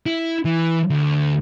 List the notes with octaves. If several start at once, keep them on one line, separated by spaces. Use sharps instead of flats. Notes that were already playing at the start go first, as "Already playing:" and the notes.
E4
E3
D2